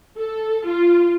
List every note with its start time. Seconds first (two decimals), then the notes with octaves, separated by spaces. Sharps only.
0.18 A4
0.66 F4